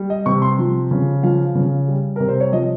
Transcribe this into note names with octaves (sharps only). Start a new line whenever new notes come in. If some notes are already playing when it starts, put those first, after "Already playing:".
Already playing: G3
D#5
C3 C#6
C6
F3
C#3
F3 F5
C#3
G3
C3 A#4
C5
C#5
F3 D#5